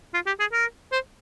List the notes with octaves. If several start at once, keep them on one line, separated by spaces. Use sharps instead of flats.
F4
G4
G#4
A#4
C5